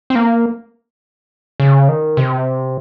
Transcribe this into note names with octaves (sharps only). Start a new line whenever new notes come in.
C4
A#3
C#3
D#3
C3